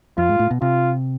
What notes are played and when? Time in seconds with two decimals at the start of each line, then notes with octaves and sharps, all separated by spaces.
0.18 F2 F4
0.29 G#2
0.39 A2
0.51 B2
0.62 C3 F4